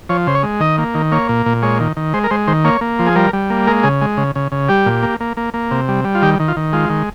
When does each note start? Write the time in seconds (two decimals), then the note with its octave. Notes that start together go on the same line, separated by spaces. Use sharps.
0.09 F3 C#5
0.27 C#3 C5
0.35 C#5
0.43 G#3
0.60 D#3 D#5
0.78 A#3
0.94 D#3
1.12 A#3 C#5
1.29 A#2
1.46 A#2
1.63 G#3 C#5
1.80 D#3
1.96 D#3
2.14 G#3 C5
2.24 A#4
2.31 G#3 C5
2.47 D#3 C5
2.64 A#3 C#5
2.81 A#3
2.99 F3
3.07 G#4
3.16 G3 A#4
3.33 G3
3.50 A#3
3.67 G#3 A#4
3.83 C#3 G#4
4.01 G#3
4.17 C#3
4.35 C#3
4.52 C#3
4.69 G3 G4
4.86 A#2
5.03 A#3
5.20 A#3
5.37 A#3
5.54 A#3
5.71 C3
5.88 G3
6.05 G3
6.15 F4
6.22 D#3 G4
6.39 D#3
6.48 F4
6.57 D#3
6.73 G#3 F4
6.90 D#3